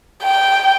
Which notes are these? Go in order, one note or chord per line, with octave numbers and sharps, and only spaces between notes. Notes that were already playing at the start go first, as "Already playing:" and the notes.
G5